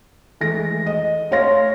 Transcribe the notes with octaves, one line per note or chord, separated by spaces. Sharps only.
E3 G#3 A3 A#6
D#5
A3 A4 C#5 F5 C6 A#6